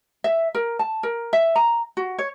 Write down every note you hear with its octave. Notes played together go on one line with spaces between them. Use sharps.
E5
A#4
A5
A#4
E5
A#5
F#4
C#5